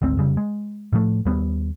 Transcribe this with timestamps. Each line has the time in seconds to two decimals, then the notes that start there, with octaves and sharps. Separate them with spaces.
0.02 G#1 D2 G#2 C4
0.17 F1 C#3 G3
0.37 G#3
0.93 A2 F3 A3
1.25 D#2 G3 B3